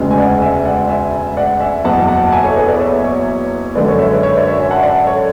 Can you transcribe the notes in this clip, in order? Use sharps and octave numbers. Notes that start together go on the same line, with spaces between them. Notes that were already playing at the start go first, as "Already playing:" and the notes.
Already playing: E1 D2 C#3 G#3
G#5
D5 F#5
E5 G#5
D5 F#5
E5 G#5
D5 F#5
E5 G#5
F#1 E2 B2 F#3 F#5 A5
F#5 A5
E5 G#5
A4 C#5
G#4 B4
B4 D5
C#5 E5
C#5 E5
F#2 D3 G#3 B4 D5
A4 C#5
C#5 E5
B4 D5
C#5 E5
B4 D5
C#5 E5
E5 G#5
F#5 A5
D5 F#5
A4 C#5